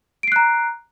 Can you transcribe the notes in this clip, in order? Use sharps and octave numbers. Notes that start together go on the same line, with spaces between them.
A#5 F#6 C7 D7